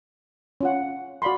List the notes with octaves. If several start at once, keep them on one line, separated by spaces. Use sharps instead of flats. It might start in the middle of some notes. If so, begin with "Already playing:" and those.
C#4 F4 F#5
F#4 D5 F5 B5 C6